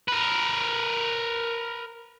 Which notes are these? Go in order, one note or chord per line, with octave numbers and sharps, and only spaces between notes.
A#4 B4